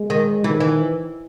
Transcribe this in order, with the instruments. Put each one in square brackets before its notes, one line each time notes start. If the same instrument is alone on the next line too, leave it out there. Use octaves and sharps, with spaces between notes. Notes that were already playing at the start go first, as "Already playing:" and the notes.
Already playing: [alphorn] G#3
[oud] D#3
[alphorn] D#3 [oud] E3
[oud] E3